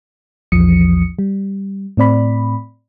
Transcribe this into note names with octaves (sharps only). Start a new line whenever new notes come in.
A#1 E2 F3 D#6 C#7
G3
A2 C4 D5 B5